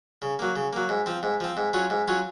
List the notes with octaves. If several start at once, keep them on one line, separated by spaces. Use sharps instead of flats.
C#3
F#3 A#3
C#3
F#3 A#3
G#2
F3 C4
G#2
F3 C4
G#2
F#3 C#4 F4
G#2
F#3 C#4 F4